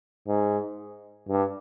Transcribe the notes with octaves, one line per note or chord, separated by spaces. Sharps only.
G#2
G2